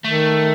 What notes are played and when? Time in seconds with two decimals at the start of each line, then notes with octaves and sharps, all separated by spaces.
0.04 D#3 A3